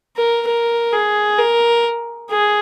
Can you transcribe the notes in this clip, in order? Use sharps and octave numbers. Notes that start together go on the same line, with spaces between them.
A#4
A#4
G#4
A#4
G#4